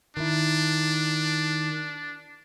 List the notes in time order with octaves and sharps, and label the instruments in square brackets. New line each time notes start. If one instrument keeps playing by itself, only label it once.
[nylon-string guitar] D#3 E4 [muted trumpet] D4